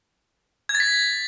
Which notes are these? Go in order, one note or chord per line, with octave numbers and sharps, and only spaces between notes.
G#6
A6
B6